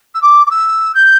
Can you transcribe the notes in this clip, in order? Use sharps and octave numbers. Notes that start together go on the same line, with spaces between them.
E6
D6
D6
E6
G6